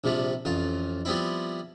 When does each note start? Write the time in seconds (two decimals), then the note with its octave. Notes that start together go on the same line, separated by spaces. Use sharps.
0.04 A#1 C3 F3 G3
0.45 A1 F2 F4
1.05 F3 G3 B3 C4 E4